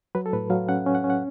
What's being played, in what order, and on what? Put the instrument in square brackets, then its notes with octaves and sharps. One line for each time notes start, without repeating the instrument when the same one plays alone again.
[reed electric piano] F#3 B4
A4
A2 B4
F#3 F5
C#4 F#5
C#4
F#5
C#4
F#5